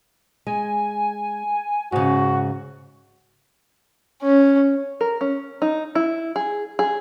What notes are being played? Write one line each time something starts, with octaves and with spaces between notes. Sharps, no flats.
G#3 G#5
G#2 C#3 F#4
C#4
A#4
C#4
D#4
E4
G#4
G#4